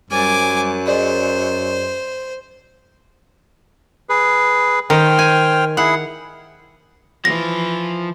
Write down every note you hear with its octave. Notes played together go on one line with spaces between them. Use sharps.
F#2 G3 C5 G#5 D6 A6
G#4 C5 D5 D#5
G#4 B4
D#3 C5 G5 F6
G#5
E4 G#4 F#5
E3 F3 A#6